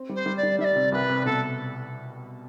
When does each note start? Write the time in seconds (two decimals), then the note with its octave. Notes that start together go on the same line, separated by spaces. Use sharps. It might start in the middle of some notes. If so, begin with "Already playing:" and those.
Already playing: C4
0.09 G3
0.15 C5
0.26 G3
0.37 D5
0.43 G3
0.59 G3 E5
0.64 D5
0.76 C3
0.92 C2 B4
1.09 C3
1.25 B2 A4